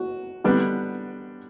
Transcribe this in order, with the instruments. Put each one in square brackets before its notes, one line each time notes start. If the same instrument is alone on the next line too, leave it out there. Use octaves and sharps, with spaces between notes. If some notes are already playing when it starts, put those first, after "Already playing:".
Already playing: [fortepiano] F#4
D3 G3 B3 D4